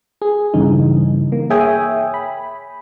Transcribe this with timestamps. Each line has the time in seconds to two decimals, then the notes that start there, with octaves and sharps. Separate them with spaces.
0.22 G#4
0.54 G2 C#3 E3 D#4
1.32 A#3
1.50 G#4 C#5 E5 G5 G#5 D#6
2.14 B5